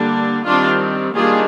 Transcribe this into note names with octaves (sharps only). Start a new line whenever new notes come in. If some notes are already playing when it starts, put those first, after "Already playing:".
Already playing: D3 G3 A#3 D4
D#3 G3 C4 D4 F4
D#3 G3 A#3 D4 F4 G#4